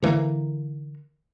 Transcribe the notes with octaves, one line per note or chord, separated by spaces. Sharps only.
D3 E3 A3 A#3